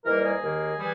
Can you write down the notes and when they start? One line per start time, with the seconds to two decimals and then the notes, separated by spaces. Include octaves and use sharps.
0.04 G#2 E3 G3 A#3 A#4
0.23 G#4
0.40 D#2 D#3 A#3
0.78 E3 G3